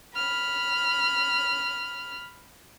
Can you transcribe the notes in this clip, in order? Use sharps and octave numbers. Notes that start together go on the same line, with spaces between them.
B5 F6